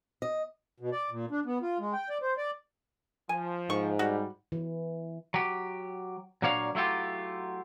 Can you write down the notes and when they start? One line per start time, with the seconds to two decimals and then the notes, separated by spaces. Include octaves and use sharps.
0.22 D#5
0.80 B2
0.92 D5
1.10 A#2
1.31 D4
1.45 B3
1.62 F4
1.79 G#3
1.93 G5
2.10 D5
2.22 C5
2.38 D5
3.29 F3 G#5
3.70 G#2 C#6
3.99 G3 F#4
4.52 E3
5.34 F#3 G4
6.42 A#2 F#3 A#3 D4 C#5 F5
6.75 F#3 A3 E4 F4 G4